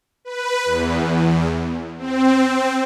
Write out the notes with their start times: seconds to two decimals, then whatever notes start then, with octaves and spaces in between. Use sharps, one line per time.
0.25 B4
0.65 E2
1.98 C4